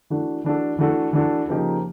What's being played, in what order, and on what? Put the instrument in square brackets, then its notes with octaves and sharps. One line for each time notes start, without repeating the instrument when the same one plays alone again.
[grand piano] E3 A3 D4 F#4 A4
E3 A3 D4 F#4 A4
E3 A3 D4 F#4 A4
E3 A3 D4 F#4 A4
C#3 F3 A#3 D#4 G4